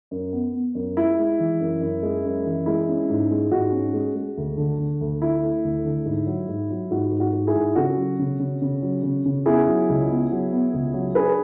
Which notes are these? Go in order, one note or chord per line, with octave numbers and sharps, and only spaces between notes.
F#2
B3
B3
F#2
G#3 E4
G#3
E3
F#2
F#2
G#3
F#2
E3
G#3 E4
C#4
G#2
G#3
G#2 F#4
C#4
G#3
G#3
D2
D3
D3
D2
A3 E4
A3
D2
D3
G#2
F#3
G#2
F#3
G#2 F#4
G#2
F#4
G#2
E4 G#4
G#2
C#3 F#4 A4
F#3
C#3
C#3
C#3
F#3
C#3
C#3
B3 E4 G#4
F#3
C#2
B3
F#3
B3
C#2
F#3
D4 G#4 B4